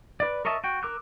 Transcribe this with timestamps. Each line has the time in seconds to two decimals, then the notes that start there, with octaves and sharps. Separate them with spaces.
0.20 B4 D5
0.45 A#4 C#5 D#5 E5 A5
0.64 F#4 G5
0.83 A#4 D6 E6 F#6